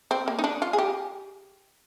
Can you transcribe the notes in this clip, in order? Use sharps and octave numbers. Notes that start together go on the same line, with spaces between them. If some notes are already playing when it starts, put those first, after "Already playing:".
C4
A#3
D#4
D4
F4
G#4
G4